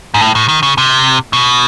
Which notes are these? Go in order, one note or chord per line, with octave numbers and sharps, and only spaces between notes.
G#2
A2
A2
D#3
C#3
C3
B2